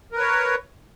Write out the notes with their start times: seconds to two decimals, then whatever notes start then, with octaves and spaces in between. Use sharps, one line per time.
0.12 A#4
0.16 B4
0.20 C#5